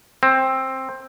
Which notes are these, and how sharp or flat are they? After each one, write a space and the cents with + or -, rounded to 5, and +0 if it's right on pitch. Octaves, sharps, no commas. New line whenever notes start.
C4 +10